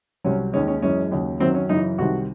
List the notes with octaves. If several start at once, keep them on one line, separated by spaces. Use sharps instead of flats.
C2 C3 F#3 C#4
D#2 D#3 G#3 C#4
C#4
F#2 E3 G#3 C#4
D#2 C#3 F#3
F#2 D#3 F#3 C4
C#4
F#2 C#3 E3 D#4
C2 C3 D#3 F#4